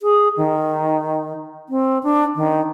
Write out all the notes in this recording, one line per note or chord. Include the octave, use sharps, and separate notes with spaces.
G#4
D#3
C4
D4
D#3